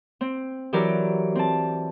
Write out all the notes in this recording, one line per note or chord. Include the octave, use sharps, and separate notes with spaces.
C4
E3 F#3 G4 A#4 D5
C4 A5